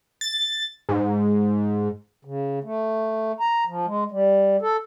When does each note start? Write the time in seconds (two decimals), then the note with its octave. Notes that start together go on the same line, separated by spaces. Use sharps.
0.21 A6
0.89 G#2
2.25 C#3
2.64 A3
3.40 A#5
3.67 F3
3.86 G#3
4.12 G3
4.62 A4